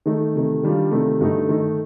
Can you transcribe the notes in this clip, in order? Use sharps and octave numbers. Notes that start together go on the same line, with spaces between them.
D#3 A3 D#4
C3 D#3 A3
D#3 G3 D4 F4
C3 D#3 A3
G2 D3 A3 D#4
D#3 A3 D#4